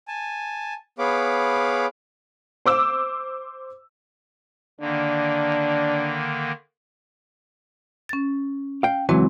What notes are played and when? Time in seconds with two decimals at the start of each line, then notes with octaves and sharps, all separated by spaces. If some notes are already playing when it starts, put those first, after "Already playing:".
0.08 G#5 A5
0.99 B3 G#4 C#5 F5 B5 D6
2.66 C5 D6 E6
4.80 D3 D#3 A#3 D4
8.09 C#4 A6
8.83 F5 G5
9.09 C#2 E3 F#3 G#3 C4